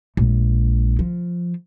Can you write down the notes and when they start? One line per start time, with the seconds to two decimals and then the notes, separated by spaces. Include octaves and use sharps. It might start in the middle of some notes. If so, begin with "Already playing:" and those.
0.17 A#1 G#3
0.99 F3